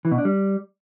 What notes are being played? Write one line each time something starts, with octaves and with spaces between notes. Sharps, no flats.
E3
B2
D4
G3